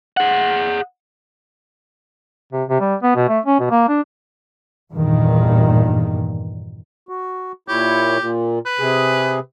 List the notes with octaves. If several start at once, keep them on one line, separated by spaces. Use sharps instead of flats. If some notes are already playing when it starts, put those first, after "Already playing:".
G#4 F#5
C3
C3
G3
B3
B2
A3
C#4
B2
A#3
D4
E2 G2 A#2 D#3
F#4
A#2 E4 G4 C#5
A#2
B4
C3 G#4